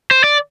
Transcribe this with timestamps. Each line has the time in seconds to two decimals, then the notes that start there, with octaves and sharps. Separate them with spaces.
0.11 C5
0.24 D5